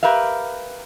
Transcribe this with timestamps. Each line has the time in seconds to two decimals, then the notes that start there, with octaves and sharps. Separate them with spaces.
0.03 G4 A#4 B4 E5 F5